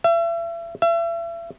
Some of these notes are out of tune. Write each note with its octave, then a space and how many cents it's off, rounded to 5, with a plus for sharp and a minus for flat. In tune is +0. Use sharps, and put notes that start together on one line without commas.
E5 +40
E5 +40